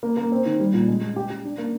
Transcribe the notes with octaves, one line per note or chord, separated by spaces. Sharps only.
A#3
A#3
C4
D#3
G3
A#2
G#3
G#3
G4
G4
D4
A#3